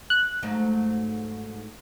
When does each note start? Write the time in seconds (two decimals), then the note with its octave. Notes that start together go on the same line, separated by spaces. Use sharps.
0.10 F#6
0.43 G#2 F#3 A3